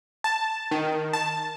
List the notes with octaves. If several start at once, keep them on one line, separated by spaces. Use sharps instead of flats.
A5
D#3
A5